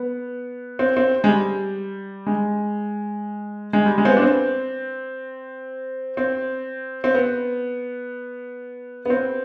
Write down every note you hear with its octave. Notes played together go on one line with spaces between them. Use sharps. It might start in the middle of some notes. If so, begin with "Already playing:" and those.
Already playing: B3
C4
C4
G#3
G3
G#3
G#3
G3
G#3
C4
B3
D4
C4
C4
C4
B3
B3
C4